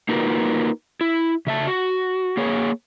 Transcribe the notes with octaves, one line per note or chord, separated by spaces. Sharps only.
A#3 D#4 F4 F#4 A#4 B4
E4
C#3 E5 A5
F#4
A#3 G#4 C#5